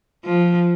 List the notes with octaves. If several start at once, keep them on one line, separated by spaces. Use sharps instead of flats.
F3